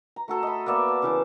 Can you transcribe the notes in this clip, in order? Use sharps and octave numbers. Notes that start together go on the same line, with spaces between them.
A#5
A3 F#4 A4
D#5 B5
A#3 B3 D5 E5
A5
C#3 E3 A5